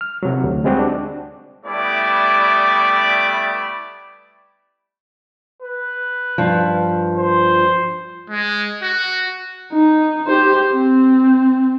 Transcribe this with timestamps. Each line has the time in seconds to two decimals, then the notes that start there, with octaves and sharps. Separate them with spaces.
0.01 F6
0.23 C3 F#3
0.44 D2
0.64 G3 G#3 C4 F#4 G4 C5
0.79 D4
1.66 G3 A3 B3 E4 D5
5.62 B4
6.38 G2 F3
7.17 C5
8.30 G#3
8.83 F#4
9.73 D#4
10.27 G4 C5
10.73 C4